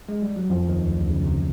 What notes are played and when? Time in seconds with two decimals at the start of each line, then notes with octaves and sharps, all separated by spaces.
0.09 G#3
0.22 G3
0.36 F#3
0.50 F2 F3
0.68 D#2 D#3
0.87 D2 D3
1.00 D3
1.06 C#3
1.24 C3